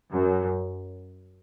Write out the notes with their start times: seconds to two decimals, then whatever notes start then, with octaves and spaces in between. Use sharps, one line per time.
0.10 F#2